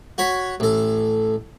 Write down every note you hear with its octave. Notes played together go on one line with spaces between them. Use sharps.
F#4 C#5 B5
A1 A4